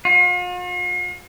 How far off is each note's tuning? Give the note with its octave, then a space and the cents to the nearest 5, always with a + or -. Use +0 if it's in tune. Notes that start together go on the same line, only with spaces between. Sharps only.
F4 +45